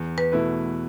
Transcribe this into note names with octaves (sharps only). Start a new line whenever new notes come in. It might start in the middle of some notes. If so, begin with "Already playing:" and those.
Already playing: E2
B4
B2 A3 E4 B4